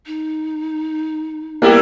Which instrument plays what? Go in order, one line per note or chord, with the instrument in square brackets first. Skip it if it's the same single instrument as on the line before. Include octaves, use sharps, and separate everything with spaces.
[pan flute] D#4
[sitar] G3 E4 G4 [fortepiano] A#3 B3